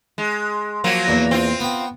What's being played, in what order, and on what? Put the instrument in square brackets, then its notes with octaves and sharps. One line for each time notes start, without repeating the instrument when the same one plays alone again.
[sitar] G#3
F3 F#3 A#3
[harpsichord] E2 A#2
[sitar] C4 F4
[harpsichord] B3 G5